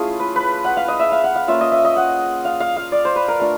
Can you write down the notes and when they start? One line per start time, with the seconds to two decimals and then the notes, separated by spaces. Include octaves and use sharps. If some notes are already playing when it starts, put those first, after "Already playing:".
Already playing: A3 C#4 E4 F4 G#4
0.20 B4
0.36 B4
0.65 F#5
0.77 F5
0.88 D#5
1.00 E5
1.12 F5
1.24 F#5
1.36 F5
1.48 A#3 C#4 F4 E5
1.61 D#5
1.72 E5
1.85 D#5
1.96 F#5
2.45 F5
2.60 F5
2.77 F5
2.92 D5
3.05 C5
3.16 B4
3.28 A#4
3.40 A3 D4 F4